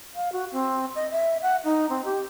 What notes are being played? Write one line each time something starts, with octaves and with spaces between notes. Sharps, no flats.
F5
F#4
C4
D#5
E5
F#5
D#4
C4
G4